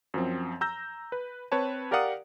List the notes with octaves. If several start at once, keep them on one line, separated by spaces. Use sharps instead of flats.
F#2 F3 C4
A#5 E6 G6 A#6
B4
C4 B4 C#5 A5
G4 A#4 D5 F5 F#5 D#6